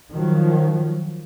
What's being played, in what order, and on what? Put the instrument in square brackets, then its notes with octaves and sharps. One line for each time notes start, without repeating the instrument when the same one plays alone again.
[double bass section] D#3 F3 F#3